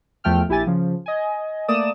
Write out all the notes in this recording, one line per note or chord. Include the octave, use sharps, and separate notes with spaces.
E2 F3 A3 G5 F6
A#1 E4 G4 G#5 A6
C#3 F3
D#5 G#5
A3 A#3 D5 D6 D#6 E7